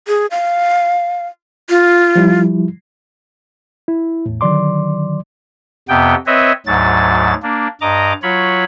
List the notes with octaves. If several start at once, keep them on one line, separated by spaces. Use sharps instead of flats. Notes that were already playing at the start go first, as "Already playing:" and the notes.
G#4
F5
F4
F3 G3 E4
E4
E2 A2
D3 D#3 F#3 D5 C6 D6
F2 C3 B3 G5
C4 B4 C#5 D#5 E5
D2 G#2 F#3 A6
A#3 D4
G2 D#5 A#5 D6
F#3 F4 C#5 B5